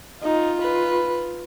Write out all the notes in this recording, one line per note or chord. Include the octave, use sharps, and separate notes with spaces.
D#4 F4
B4